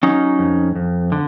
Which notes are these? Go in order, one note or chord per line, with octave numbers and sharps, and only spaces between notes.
F#3 C#4 D#4
F2
F2
D3